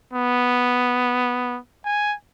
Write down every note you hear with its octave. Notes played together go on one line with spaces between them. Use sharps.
B3
G#5